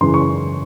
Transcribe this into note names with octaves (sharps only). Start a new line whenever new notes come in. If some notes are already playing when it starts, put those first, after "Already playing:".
F#2 C#3 E3 C6
C#6